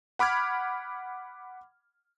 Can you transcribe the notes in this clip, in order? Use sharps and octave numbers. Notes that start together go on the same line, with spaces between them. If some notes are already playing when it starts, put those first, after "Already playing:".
F#5 B5 D6 F6 G#6